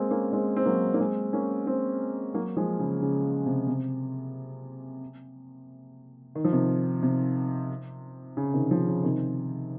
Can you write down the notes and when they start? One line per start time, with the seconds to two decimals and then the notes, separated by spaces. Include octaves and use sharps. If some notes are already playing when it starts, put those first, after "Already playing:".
Already playing: G#3 A#3 C4
0.11 A#3 C#4
0.33 G#3 C4
0.57 C4
0.66 F#3 A#3
0.94 A#3
0.99 G#3 C4
1.33 A#3 C#4
1.67 G#3 C4
2.34 F#3 A#3
2.57 F3 G#3
2.79 C#3
3.02 C#3
3.46 C3
3.67 C3
6.35 D#3
6.45 F3
6.53 C3 D#3
7.03 C3
8.37 C#3
8.54 C3 D#3
8.71 C#3 F3
8.88 C#3
9.04 C3 D#3